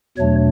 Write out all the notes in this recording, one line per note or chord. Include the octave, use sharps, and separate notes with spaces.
E2 B2 F#3 A3 D4 C#5